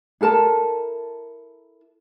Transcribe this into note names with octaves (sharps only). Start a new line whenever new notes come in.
E4 A4 A#4 A5